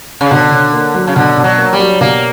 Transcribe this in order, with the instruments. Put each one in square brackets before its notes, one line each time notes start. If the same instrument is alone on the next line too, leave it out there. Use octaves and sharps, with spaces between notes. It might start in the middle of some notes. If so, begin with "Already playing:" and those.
[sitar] C#3
[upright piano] B2 [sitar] D3
[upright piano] B2
A#3
F#3
[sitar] C#3
[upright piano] B2 [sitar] D3
[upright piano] B2
[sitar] F#3
[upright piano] A#3
[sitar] G3
[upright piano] F#3
[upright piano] B2 [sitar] A#3